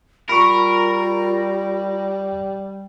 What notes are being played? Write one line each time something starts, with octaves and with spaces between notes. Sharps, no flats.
G3 F4 A#4 B5 C#6